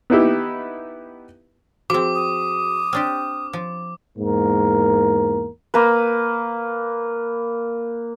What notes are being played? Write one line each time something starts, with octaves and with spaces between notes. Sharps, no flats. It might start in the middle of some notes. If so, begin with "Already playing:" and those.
B3 D#4 E4 G4
F3 C4 F#4 G#4 D6
D#6
C4 D4 G4 F6
F3
E2 G#2 A#3 A#4
A#3 B4